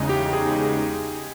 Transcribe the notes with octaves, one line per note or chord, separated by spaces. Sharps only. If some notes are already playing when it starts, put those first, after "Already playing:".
Already playing: E2 C#3 G#3 D#4
G4
G#4